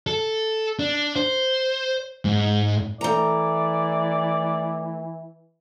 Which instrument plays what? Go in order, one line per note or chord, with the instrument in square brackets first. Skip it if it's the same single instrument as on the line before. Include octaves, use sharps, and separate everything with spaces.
[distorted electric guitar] A4
D4
C5
G#2
[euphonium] E3 [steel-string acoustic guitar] A3 A#5 [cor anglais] D5